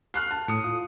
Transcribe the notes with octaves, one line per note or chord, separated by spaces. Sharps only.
F6 F#6 C7
A5
A2 D#6 C#7
F4 D#6